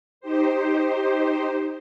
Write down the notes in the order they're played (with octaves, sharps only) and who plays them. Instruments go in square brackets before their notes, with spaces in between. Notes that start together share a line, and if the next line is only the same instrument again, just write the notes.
[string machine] D#4 G4 C5